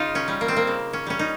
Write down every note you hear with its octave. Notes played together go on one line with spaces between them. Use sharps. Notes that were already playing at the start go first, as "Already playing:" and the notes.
Already playing: C#3 D#4 F4
C#4
G3
A#3
C4
A#3
C#3
C#4
G3 C#4
D#4